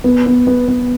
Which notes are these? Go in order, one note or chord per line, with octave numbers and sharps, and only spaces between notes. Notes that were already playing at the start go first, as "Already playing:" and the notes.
B3
B3
B3
B3